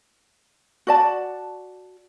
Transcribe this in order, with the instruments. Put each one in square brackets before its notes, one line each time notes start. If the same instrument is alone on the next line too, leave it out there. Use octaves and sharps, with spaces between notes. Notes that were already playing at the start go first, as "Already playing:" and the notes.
[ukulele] F#4 D5 A5